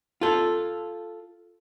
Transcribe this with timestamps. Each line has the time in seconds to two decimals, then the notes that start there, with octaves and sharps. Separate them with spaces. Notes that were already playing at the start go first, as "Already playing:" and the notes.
0.21 F4 A4